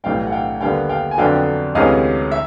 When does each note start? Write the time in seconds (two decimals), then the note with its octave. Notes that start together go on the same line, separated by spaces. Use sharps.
0.04 B1 A2 E3 G3 F5 G5
0.27 F#5
0.32 F5 G5
0.61 D#2 D3 G3 B3 F5 G5
0.89 F5 G5
1.11 G#5
1.18 F2 D3 F#3 B3 D4 F5 G5
1.75 D2 C3 E3 G#3 C#4 D#5 F5
2.32 E5